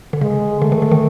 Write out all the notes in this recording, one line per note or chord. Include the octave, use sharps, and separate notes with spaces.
D3
C#3 G#3
D3 A3
D#3
D3
D#3